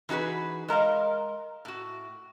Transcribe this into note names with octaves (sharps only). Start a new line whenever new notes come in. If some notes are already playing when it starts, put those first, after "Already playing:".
E3 D#4 F#4 G#4 B4
G#3 A#4 D#5 F5
A2 F#4